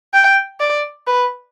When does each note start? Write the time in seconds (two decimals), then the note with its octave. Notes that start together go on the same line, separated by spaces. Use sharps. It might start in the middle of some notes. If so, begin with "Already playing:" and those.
0.14 G5
0.60 D5
1.07 B4